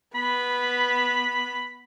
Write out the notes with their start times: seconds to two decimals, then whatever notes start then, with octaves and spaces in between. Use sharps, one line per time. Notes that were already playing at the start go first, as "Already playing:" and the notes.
0.15 B3 B5